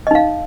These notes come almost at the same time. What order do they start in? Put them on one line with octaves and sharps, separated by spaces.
D#5 D#4 F5